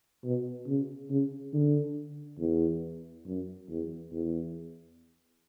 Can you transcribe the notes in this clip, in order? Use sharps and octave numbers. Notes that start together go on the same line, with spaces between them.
B2
C#3
C#3
D3
E2
F#2
E2
E2